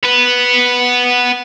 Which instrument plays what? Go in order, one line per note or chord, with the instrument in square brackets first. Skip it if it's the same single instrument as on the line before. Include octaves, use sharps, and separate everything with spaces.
[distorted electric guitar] B3 B4